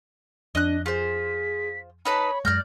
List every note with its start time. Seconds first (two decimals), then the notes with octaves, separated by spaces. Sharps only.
0.55 F2 D4 D#5 F#6
0.86 F4 G#4 C5 B6
2.05 D#4 B4 C#5 A5 B5
2.45 F#2 G#3 D5 F6 G6 A#6